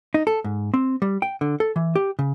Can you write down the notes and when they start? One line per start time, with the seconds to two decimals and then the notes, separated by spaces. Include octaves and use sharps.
0.14 D#4
0.27 A4
0.44 G#2
0.74 C4
1.02 G3
1.22 G5
1.41 D3
1.60 A4
1.76 E3
1.96 G4
2.19 C#3